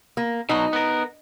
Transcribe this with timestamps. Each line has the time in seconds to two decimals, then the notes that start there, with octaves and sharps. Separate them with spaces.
0.17 A#3
0.49 B2 F#3 D#4
0.73 B3 A#4